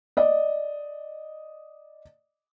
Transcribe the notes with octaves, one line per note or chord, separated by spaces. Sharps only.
D5 D#5